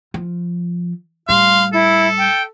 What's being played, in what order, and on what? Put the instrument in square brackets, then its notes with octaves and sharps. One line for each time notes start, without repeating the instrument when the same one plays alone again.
[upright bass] F3
[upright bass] A2 G3 [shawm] F5 [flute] C6
[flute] E4 [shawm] A4
[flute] G5